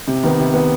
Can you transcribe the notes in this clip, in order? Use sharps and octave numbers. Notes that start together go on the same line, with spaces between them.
C3
D#3 B3
C3
D#3 B3